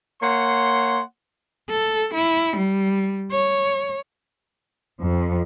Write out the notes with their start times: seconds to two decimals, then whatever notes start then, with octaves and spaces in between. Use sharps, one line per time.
0.22 A#3 C#5 F#5 C6
1.70 A4
2.14 E4
2.56 G3
3.31 C#5
5.00 F2